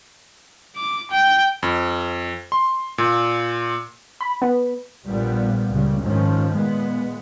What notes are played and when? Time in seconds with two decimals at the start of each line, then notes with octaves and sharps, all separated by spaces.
0.77 D6
1.11 G5
1.63 F2
2.52 C6
2.98 A#2
4.21 B5
4.42 B3
5.05 A#1 A#2 G3 B3
5.70 C#2 A#2 C#3 G3
6.00 G#2 D#3 F3 C#4
6.53 A#2 G#3 B3